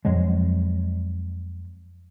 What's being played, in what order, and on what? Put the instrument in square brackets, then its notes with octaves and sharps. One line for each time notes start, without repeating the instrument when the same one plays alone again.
[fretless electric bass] F2 F3 F#3 G#3